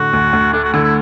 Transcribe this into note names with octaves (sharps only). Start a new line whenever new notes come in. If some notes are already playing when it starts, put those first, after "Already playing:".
Already playing: A2 D3 A3 F#4
D2
D2
A3 D4
F#4
D3 E4
E4